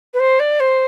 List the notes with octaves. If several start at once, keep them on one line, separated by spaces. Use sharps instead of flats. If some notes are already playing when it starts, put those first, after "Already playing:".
B4
C5
D5
C5